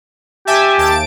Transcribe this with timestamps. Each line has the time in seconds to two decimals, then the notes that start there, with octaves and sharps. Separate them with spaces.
0.47 G4 E5 G#5 A5
0.78 D#2 A5 D7